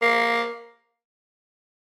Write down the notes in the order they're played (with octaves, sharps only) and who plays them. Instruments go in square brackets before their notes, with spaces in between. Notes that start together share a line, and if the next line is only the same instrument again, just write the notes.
[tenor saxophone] A#3